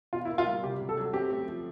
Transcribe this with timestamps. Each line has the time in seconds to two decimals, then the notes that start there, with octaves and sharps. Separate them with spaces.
0.13 B2 F4
0.25 E4
0.30 A#3
0.38 F4
0.47 G3
0.63 C3 G4
0.81 F#3
0.89 A4
0.97 F#3
1.13 C4 G4
1.30 A3
1.48 F3